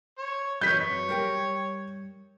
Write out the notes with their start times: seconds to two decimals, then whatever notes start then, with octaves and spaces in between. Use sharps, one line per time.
0.18 C#5
0.61 F#2 F#3 B4 C#5 G6 B6
1.09 G3 A#4 G5